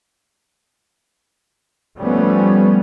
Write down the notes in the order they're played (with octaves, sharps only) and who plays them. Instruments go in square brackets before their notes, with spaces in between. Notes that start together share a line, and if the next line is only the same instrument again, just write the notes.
[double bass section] F3 G3 A3 B3 C#4